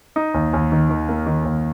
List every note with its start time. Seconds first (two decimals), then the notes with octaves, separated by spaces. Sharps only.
0.16 D#4
0.34 D#2
0.53 D#2
0.72 D#3
0.89 D#3
1.09 A#3
1.26 D#3
1.45 D#2